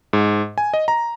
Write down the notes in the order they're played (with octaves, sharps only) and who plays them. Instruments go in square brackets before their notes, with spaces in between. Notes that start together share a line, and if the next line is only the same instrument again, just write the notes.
[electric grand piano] G#2
G#5
D#5
A#5